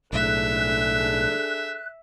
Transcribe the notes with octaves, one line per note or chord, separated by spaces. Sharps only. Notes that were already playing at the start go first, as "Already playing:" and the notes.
B1 A2 D4 G#4 A4 E5 F#6